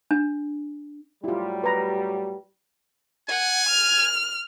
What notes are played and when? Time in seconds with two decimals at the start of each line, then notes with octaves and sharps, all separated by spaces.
0.11 D4
1.24 A2 F#3 G3 E4 F4
1.64 B4 A#5
3.29 F#5 G#5
3.69 F6